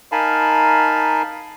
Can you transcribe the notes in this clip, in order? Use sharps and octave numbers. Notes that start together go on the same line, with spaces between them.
D#4 A#4 F5 G#5 A5 B5